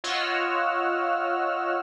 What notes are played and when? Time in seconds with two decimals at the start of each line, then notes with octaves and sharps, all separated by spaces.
0.04 F4 C#5 D#5 F#5 E6 F6